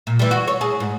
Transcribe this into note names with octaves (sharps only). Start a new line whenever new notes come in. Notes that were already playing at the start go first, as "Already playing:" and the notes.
A#2
E3 G3
F#4
C#5
G#4
G#2